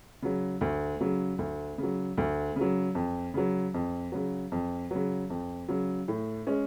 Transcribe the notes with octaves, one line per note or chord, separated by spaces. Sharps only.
C#3 F#3
D2
C#3 F#3
D2
C#3 F#3
D2
C#3 F#3
F2
C#3 F#3
F2
C#3 F#3
F2
C#3 F#3
F2
C#3 F#3
A2
G#3 C#4